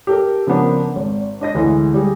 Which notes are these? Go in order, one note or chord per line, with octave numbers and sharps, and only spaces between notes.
G4 A4 A#4
C#3 F3 A#3 B3 D4
G#1
D4 D#5 A#6
D2 E3 G#3
G3 G4 G#4